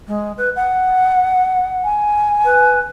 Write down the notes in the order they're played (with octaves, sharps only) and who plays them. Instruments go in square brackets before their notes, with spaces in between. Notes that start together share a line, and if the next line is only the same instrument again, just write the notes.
[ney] G#3
B4
F#5
[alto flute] G#5
[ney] B4